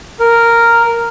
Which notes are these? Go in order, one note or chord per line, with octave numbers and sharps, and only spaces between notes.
A#4